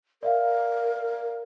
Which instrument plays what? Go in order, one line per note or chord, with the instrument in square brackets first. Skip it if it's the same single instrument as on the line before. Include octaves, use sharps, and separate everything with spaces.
[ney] A#4 [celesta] D5 E5 F5